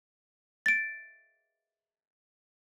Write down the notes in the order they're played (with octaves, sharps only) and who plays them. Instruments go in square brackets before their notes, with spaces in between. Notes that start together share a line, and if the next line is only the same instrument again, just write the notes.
[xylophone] A6 D7